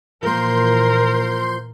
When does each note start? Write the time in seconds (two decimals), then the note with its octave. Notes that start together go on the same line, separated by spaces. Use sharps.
0.23 A#2 E3 F3 A#3 A#4 C6 G6